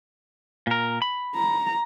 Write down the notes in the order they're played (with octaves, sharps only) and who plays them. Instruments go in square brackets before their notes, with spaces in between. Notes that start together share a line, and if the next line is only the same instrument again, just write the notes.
[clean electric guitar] A#2 A#4
B5
[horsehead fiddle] A#5